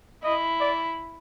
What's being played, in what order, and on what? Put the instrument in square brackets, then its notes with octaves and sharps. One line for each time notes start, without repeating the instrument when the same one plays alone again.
[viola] E4 [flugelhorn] D#5
[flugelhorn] D5